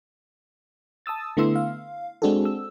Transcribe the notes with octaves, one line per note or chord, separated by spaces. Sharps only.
A5 D#6 E6 A6
D3 A3 B3 E4 C6 E6
F5
G#3 C4 D4 F#4 G#4 A4
E6